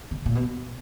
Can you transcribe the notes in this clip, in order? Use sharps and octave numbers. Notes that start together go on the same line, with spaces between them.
C#3
A#2
B2